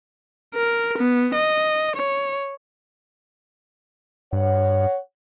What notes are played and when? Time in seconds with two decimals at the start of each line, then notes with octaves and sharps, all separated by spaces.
0.55 A#4
0.98 B3
1.34 D#5
1.96 C#5
4.33 G2 C#5 F#5